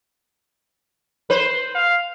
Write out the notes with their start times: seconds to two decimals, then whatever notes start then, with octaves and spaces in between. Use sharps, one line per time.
1.30 B4 C5
1.75 F5